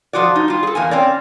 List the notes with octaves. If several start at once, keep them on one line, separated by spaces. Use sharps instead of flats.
F3 F4 F#4 D5
D#4
G3 F4
G#4 A4
E2 A#3 G#5
C4 C#4 D5